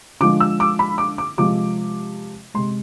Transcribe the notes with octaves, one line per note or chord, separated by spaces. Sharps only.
D3 F3 G#3 D6
E6
D6
B5
D6
D6
C3 F3 G#3 D6
C3 G#3 C6